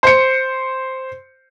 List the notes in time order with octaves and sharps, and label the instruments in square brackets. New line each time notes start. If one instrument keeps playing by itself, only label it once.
[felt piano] C5 C#7